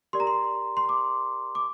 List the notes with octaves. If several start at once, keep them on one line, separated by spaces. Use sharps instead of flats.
G4 A#4 D5 C6
A#5
C6
C6
D6
D6